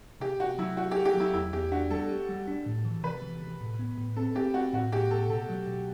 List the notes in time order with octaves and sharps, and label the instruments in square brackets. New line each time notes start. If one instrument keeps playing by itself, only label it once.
[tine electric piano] C3 [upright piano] G4
[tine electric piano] C3 [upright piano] F#4
[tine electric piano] F#3 [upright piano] E4
[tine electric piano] E4 [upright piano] F#4
[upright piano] G4
[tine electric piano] A4
[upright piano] G4
[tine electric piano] F#3
[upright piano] E4
[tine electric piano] E2 [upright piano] E4
[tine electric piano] E2 [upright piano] G4
[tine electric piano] D4 [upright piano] F#4
[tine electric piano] G3 [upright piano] A4
[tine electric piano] G4
G3
D4
A2
E3
[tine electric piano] C3 [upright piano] B4
[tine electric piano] E3
C3
A2
B3
A2
[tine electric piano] C4 [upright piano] A4
[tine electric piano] C4 [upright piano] G4
[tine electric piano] C4 [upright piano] F#4
[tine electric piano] A2 [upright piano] F#4
[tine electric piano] A2 [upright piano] G4
[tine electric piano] A2 [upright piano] A4
[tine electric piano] B2 [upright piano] A4
[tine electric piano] F#3
B2